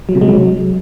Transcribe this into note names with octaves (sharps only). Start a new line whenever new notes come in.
F#3
C3
G#3
F#3